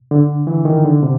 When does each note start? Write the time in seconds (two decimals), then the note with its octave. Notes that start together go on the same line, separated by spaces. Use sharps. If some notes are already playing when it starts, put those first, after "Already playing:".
0.11 D3
0.47 E3
0.65 D#3
0.85 D3
1.03 C3